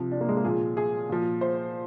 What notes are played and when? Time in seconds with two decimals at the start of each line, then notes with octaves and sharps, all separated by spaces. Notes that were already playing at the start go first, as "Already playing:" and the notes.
Already playing: C3 F3
0.11 D4
0.21 A#3
0.29 G#3
0.37 A#3
0.44 A#2 F3 G#4
0.77 G#4
1.09 A#2 F3
1.41 C5